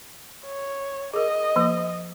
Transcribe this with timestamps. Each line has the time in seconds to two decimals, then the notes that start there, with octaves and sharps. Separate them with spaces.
0.44 C#5
1.14 G#4 A#4 D#5
1.56 F3 A#3